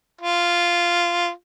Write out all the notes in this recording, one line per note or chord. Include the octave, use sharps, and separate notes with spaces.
F4